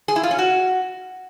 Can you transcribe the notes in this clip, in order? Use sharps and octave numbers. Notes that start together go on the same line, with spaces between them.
G#4
E4
F4
C#4
F#4